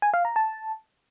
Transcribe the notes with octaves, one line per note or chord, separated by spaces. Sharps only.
G#5
F5
A#5
A5